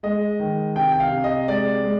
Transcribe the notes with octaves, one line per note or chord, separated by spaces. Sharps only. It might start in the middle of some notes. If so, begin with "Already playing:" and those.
G#3 D#5
D#3
C3 G5
G5
F5
C3
D#5
G#3 D5
G#3